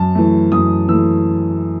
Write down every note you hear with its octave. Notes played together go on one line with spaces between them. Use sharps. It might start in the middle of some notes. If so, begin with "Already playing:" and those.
Already playing: F#2 A5
E3 A3
F#2 D#6
E3 A3 E6